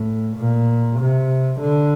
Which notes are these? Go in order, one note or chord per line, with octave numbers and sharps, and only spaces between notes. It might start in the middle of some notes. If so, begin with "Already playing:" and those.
Already playing: A2
A#2
C3
D3